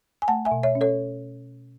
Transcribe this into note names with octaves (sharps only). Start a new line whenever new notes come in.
G#5
A3 F#5 A5
E5 G#5
B2
C#5 E5
C#4
A4 C#5